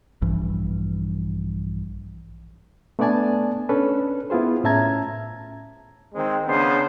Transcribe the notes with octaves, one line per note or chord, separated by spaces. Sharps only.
A#1 G2 E3
A3 B3 D4 D5 G#5 A5
C#4 D4 A4 B4
B3 E4 F4 G#4 C5
A2 C#4 E5 A5 A#5 G#6
D#3 G#3 C4
C#3 B3 D4 C5